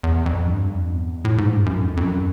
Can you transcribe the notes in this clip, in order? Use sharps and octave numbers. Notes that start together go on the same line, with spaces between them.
E2
F2
G2
F2
E2
A2
G#2
G2
F#2
F2
F2
F#2